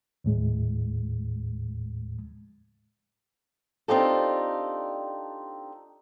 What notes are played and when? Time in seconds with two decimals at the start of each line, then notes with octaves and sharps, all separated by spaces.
0.24 D#2 A2 G#3
3.88 C4 D4 D#4 F4 G4 A4